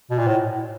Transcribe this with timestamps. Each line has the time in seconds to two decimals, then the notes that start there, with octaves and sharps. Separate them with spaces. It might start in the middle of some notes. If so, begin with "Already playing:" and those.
0.10 B2
0.18 A#2
0.27 A2